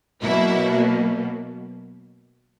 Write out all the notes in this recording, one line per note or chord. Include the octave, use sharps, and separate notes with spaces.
B2 F#3 A#3 E4